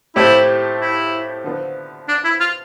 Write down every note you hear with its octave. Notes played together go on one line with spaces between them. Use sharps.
A2 F3 A3 C4 E4 G4
E4
D3 F3 B3
D4
E4
F4